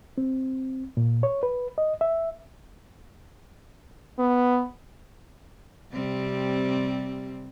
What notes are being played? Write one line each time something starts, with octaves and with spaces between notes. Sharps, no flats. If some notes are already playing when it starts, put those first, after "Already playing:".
C4
A#2
C#5
B4
D#5
E5
B3
C3 G3 C4